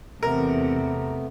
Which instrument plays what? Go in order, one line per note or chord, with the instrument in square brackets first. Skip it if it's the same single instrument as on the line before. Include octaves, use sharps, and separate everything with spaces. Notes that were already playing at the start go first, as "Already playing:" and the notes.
[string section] E2 C3 [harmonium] A3 B3 [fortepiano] A#4